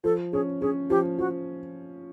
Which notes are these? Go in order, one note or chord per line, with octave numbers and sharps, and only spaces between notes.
F3 A4
C#4 G#4
C#4 G#4
F3 G4
F3 F#4